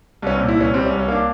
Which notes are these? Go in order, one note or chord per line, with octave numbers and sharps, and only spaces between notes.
C2 C#4
A#2 C4
E4
C2 C#4
G3 C4
C#4
C2
C#4
A#3 D4